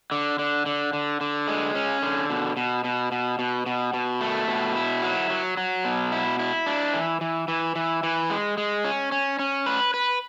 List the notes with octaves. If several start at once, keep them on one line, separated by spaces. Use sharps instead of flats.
D3
D3
D3
D3
D3
G#3
C#4
D3
B2
B2
B2
B2
B2
B2
B2
A3
B2
E4
F#3
F#3
F#3
B2
E4
E4
D4
E3
E3
E3
E3
E3
G#3
G#3
C#4
C#4
C#4
B4
B4